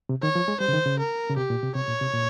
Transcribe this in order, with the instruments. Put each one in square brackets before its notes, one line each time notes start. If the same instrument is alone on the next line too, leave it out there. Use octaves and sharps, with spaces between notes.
[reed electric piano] C3
[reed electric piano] D#3 [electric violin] C#5
[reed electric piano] F3
G#3
[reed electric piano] G3 [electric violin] C5
[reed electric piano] C#3
D#3
C#3
[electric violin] A#4
[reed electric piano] C#3
[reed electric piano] C3 [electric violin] G4
[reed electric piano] A#2
C3
[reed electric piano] C3 [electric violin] C#5
[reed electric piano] A#2
C3
A#2